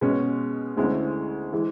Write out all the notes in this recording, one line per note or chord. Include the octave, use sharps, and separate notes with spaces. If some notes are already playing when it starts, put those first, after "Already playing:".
B2 G#3 C#4
D2 D3 G#3 C#4 E4
E3 G#3